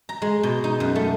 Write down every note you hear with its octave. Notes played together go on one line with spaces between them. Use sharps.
A#5
G#3
B2
D#4
F#2
A3